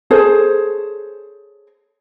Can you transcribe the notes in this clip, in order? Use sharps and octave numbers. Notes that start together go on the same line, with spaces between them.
G#4 A4 C5 C#5